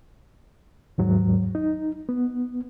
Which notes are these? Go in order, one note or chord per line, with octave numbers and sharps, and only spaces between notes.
D#2 G#2 F#3
D#4
B3